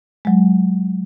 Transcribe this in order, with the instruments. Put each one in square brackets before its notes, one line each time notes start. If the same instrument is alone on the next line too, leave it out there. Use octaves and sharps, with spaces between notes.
[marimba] F#3 G#3